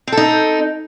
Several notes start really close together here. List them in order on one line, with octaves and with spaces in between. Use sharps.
C4 A4 D#4